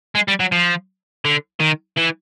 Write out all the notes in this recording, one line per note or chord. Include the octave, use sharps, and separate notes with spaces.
G#3
G3
F#3
F3
D3
D#3
E3